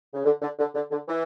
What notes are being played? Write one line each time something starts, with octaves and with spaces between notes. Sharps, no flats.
C#3
D3
D3
D3
D3
D3
E3